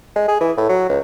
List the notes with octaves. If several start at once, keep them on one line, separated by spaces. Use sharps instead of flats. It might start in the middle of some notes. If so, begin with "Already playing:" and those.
G#3
G#4
E3
A2
F#3
C#2